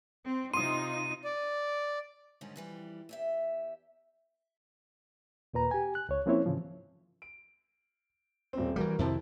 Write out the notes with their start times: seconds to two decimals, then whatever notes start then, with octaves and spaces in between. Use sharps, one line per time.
0.25 C4
0.54 C3 D#4 F4 C6 D#6 D#7
1.24 D5
2.41 G#2 D3 D#3 G3 C#4
2.56 F2 E3 G3
3.09 E2 G4 E5
5.54 D#2 A#2 B4 A#5
5.71 G4 G#5
5.95 F#6
6.09 C#2 C#5
6.26 F3 A#3 C4 C#4 E4 C#5
6.46 G#2 C#3 E3 F3
7.22 D7
8.53 D#1 C4
8.76 E3 F#3 G3 F#4 A#4
8.99 F2 C3 D#3 E4 C5 A5